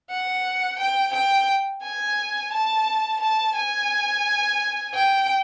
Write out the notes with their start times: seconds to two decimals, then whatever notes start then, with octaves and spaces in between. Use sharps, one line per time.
0.10 F#5
0.79 G5
1.13 G5
1.82 G#5
2.52 A5
3.20 A5
3.55 G#5
4.94 G5